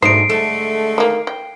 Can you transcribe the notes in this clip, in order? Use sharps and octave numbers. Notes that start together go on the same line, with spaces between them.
G#2 B2 D3 A3 D#4 C5 C7 D7
D3 G#3 A3 A4
D#3 A#3
G5